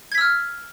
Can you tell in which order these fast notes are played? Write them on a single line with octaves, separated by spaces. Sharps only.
G#6 B6 E6 F6